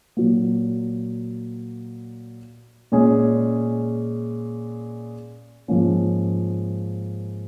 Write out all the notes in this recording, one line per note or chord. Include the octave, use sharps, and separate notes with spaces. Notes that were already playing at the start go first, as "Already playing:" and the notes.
A#2 F#3 A#3
A#2 G#3 C#4 G#4
G#2 F3 A#3 C#4 F4